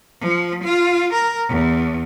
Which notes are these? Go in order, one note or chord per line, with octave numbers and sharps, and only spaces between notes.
F3
F4
A#4
E2